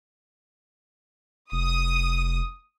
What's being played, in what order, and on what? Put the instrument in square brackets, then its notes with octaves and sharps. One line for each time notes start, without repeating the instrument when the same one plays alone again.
[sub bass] F1 [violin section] D#6